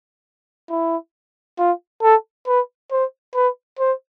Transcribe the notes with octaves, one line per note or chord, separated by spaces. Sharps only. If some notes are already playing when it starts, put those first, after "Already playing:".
E4
F4
A4
B4
C5
B4
C5